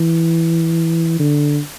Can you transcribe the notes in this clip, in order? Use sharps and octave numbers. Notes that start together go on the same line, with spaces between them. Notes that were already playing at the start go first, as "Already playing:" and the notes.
Already playing: E3
D3